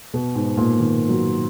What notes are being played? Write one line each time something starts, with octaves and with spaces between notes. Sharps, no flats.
B2
G#2
A#2
D#3
F#3